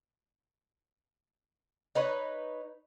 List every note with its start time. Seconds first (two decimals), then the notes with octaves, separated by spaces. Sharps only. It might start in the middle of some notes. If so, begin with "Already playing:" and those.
1.95 D#4 B4 C#5